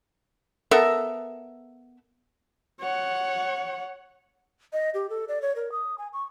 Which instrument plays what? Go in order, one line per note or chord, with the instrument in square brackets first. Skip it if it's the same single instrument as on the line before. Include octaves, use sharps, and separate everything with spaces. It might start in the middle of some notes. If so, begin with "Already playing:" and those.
[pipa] B3 A4 A#4 E5
[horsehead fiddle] C#5 F#5
[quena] D#5
G4
A4
D5
C#5
A#4
D#6
G#5
C#6